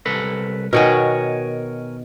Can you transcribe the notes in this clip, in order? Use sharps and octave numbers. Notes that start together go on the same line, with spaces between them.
C2 A4 B4
B2 D#3 F#4 A#4 C#5 G#5